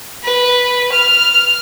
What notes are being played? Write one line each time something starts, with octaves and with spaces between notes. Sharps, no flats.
B4
F6